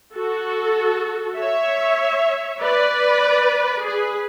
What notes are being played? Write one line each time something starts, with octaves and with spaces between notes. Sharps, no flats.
F#4 A4
C#5 E5
B4 D5
G#4 B4